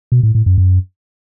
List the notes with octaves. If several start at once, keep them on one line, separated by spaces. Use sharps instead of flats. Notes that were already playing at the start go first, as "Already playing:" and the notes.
B2
A2
A2
F#2
F#2